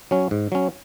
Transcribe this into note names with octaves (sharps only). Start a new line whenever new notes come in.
F#3 C#4
G#2
F#3 C#4